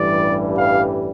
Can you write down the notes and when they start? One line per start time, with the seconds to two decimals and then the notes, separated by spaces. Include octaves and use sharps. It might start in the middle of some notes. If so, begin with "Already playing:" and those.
Already playing: A1 G2 E3 G3 D5
0.57 F5